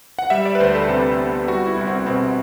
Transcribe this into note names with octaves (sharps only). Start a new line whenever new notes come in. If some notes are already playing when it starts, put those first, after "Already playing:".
F#5
G3 E5
D5
B4
D2 C5
A4
C3
B3
G3 F#4
E4
C2
C4
B2 C4